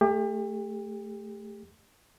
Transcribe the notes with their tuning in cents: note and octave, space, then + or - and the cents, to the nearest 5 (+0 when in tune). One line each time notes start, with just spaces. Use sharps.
A3 +0 G4 +35